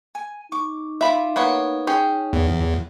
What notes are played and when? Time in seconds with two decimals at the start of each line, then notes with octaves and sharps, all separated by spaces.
0.15 G#5
0.52 D#4 C#6 D6
1.01 E4 F4 E5 B5 D6
1.36 A#3 B3 C#5
1.87 C#4 G#4 G5
2.33 E2